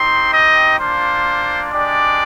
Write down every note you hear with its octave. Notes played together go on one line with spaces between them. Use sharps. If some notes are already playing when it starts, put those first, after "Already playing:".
Already playing: C4 D#4 G4 C6
D#5
A#3 D4 F4 C5
G#3 D4 G4 D5